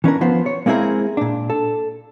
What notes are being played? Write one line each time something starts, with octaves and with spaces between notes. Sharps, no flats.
E3 C#4 D4 A#4
F3 B3 C5
C#5
G#3 A#3 C4 E4 G#4 A#4
A#2 D4
A4